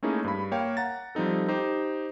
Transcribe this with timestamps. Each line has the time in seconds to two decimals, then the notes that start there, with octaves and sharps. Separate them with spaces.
0.03 A3 A#3 C#4 D#4 E4 G#4
0.24 G2 B5
0.51 A#3 C#5 F5 G5
0.77 F#5 A#5 A6
1.15 F3 G3 C4 D#4 A4
1.48 D#4 G4 C5